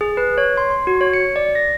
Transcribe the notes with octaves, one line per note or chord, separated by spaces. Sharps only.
G#4
B4
C#5
C6
C6
F#4
C#5
C#7
D5
A#6